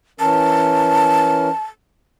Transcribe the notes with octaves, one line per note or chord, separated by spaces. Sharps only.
E3 C#4 A#4 A5